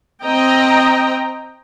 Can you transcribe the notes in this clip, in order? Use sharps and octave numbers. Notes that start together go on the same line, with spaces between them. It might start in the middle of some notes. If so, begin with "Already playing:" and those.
C4 D#5 G5 A#5